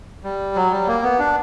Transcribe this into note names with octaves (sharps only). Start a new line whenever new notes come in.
G3
F#3
G3
A#3
B3
D4